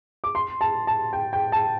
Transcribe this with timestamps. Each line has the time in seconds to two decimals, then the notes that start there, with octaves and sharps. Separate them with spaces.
0.24 D6
0.35 C6
0.61 A5
0.87 A5
1.13 G5
1.33 G5
1.52 A5